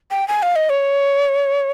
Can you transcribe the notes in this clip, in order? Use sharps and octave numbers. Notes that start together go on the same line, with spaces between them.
G5
G#5
F5
D#5
C#5